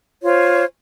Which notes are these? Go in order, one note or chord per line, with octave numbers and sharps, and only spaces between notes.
F4 C5 C#5